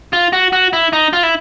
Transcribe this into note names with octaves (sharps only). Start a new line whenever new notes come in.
F4
F#4
F#4
E4
D#4
F4
E4